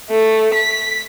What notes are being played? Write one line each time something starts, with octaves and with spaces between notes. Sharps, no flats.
A3
B6